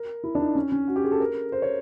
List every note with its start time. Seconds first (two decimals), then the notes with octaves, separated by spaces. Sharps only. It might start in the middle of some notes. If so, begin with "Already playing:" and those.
Already playing: A#4
0.24 E4
0.35 D4
0.40 D#4
0.55 C#4
0.72 C#4
0.88 F#4
0.96 G4
1.04 G#4
1.12 A4
1.20 A#4
1.52 C5
1.62 C#5